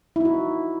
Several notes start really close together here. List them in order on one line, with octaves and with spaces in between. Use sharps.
E4 D#4 F#4